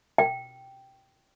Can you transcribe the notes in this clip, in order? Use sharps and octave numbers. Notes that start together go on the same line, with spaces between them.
G5